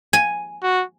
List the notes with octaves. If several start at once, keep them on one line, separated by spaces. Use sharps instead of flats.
G#5
F#4